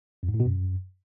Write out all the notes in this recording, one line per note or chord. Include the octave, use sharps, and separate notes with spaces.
F2
G#2
A2
B2
F#2